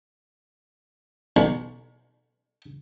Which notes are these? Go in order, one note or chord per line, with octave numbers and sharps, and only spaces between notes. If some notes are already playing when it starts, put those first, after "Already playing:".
B1